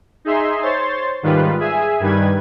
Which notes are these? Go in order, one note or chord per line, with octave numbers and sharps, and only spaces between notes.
D#4 G#4 E5 C6
C5 C#5 C6 A6
G#2 D#3 G3 F4 B4
G#4 E5 G#5
G2 D#3 G3 B4 G#6